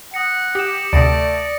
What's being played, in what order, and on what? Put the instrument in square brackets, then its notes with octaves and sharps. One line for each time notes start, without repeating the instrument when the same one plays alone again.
[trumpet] F#5 [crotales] D#6 A#6 C#7
[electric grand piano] G4 [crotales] D#6 E7
[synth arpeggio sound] D2 C3 [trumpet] A3 [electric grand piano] D5 [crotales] D#6 A#6 D7